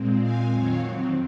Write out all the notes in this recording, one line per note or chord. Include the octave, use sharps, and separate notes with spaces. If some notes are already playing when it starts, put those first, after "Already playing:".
Already playing: A#2 G#3 C4
F5 G#5
F2 D#3 F#3 C4 C#5 F5